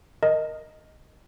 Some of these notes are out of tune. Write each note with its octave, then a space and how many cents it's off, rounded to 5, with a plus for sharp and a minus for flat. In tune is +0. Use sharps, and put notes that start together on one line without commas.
A#4 +0 D#5 +0 A#5 -45